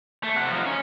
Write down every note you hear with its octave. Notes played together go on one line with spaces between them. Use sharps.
A3
C3 F#5
F3 D#4
C#4